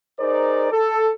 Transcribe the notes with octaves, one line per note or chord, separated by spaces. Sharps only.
D#4 G#4 A#4 C5 D5
A4